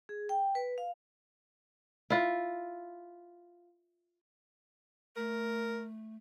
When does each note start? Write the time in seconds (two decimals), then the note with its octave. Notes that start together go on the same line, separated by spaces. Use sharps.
0.09 G#4
0.29 G5
0.55 B4
0.78 F5
2.10 E4 F4
5.16 A3 A#4